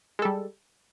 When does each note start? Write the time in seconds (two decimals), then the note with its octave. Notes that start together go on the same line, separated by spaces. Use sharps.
0.19 G#3
0.22 A4
0.25 G3